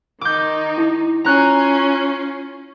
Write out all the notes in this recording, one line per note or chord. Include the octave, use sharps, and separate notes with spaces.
D#3 D#4 D6 G6
E4
C#4 F4 A#5 F#6